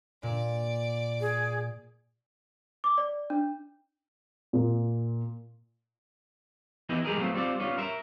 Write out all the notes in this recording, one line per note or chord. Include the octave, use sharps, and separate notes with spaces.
A#2 D5
G#4
D6
D5
D4
A#2
E3 B3 E4 G4 D#5 E5
G3 G#3 G4 G#4 A#4
D3 F#3 A3 B3 C4 F4
G3 C4 F4 D5
G3 B3 C#4 F4
A#4 E5